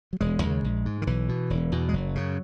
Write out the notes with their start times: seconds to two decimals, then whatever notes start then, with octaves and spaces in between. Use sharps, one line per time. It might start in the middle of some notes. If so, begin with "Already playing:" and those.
0.13 F#3
0.21 E1 G#3
0.43 D#2 C#3
0.64 A#1
0.85 G#2
1.02 D#3
1.07 B1 E3
1.29 B2
1.50 E1
1.72 E2 B2
1.89 G#3
1.93 F#1 F#3
2.15 F#2 C#3